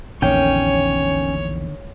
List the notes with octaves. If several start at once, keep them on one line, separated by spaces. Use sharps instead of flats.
A#1 E2 D3 D#3 A#3 C#4 C#5 G5